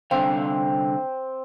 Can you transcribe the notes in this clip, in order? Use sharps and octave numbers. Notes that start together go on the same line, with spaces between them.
C2 D3 C4 F5